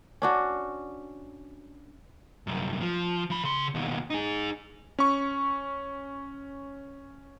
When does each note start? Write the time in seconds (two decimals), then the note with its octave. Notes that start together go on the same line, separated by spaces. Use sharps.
0.22 C#4 D4 F#4
2.47 C2 F#2
2.81 F3
3.30 F3 B5
3.44 C#3 C6
3.75 D#2 B2
4.10 D#4 G#4
4.99 C#4 C#6